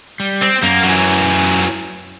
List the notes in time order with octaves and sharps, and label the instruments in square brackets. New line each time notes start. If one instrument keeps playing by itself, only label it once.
[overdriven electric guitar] G3
[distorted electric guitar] C4
[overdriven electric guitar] F#2 [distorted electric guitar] A#3
[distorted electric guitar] E3 F#3